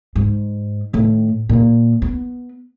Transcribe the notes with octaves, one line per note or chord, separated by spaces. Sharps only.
G#2
A2 D#3
A#2 D#3
B3